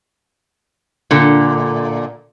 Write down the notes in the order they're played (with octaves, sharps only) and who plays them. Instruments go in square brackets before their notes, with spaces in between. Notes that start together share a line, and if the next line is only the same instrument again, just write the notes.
[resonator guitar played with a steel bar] A#2 D3